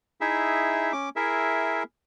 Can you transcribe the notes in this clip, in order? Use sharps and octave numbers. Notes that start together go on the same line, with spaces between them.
D#4 E4 G#4 E5
C#4 D6
E4 G#4 A#4 E5